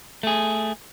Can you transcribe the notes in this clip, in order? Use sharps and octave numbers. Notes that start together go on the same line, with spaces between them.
A3 G#4